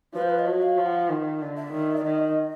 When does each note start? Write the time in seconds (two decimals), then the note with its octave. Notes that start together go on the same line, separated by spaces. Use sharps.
0.15 F3 B4
0.22 C5
0.30 B4
0.39 D#5
0.46 F#3
0.62 F5
0.78 F3
0.86 F#5
1.10 D#3
1.41 D3
1.57 E5
1.73 D#3
1.96 D5
2.04 D#3 D#5